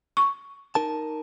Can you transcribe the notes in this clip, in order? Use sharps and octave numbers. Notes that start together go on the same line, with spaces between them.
C#6
D#4 A#4 A5